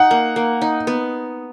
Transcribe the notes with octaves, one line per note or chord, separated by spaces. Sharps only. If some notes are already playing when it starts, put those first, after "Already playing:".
Already playing: D#4 F#5
A#3
A#3
D#4
B3